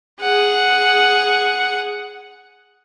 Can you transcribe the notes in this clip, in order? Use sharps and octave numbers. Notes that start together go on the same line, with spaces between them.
G#4 F#5